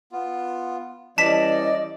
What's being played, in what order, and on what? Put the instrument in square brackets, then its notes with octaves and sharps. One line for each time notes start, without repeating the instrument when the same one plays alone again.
[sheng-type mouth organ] B3 F4
[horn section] E3 G3 C#4 [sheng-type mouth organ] D5 [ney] D#5 [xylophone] A5 B6